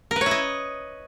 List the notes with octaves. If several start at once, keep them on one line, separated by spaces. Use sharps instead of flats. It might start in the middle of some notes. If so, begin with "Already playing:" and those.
A#4
B4
C#5
E4
D#5